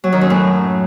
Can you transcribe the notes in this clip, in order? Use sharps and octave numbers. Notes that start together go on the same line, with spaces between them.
F#3
D#3
F#2
A2